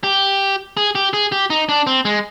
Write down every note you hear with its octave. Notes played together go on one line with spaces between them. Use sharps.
G4
G#4
G4
G#4
G4
D#4
D4
C4
G#3